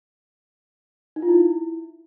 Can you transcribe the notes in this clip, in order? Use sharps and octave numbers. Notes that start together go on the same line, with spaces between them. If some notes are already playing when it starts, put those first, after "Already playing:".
D#4
F4
E4